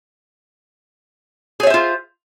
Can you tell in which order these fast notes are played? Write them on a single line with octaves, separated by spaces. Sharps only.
G#4 C#5 E5 C5 F4